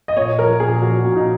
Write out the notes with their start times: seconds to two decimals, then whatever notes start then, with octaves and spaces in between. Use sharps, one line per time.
0.08 D#5
0.16 A#2 C#5
0.39 F3 A#4
0.60 A#2 G#4
0.82 F3 F#4
1.04 A#2
1.16 D#4